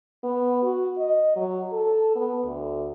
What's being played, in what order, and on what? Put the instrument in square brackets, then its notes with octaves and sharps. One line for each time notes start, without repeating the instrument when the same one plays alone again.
[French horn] B3
F#4
D#5
F#3
A4
B3
D2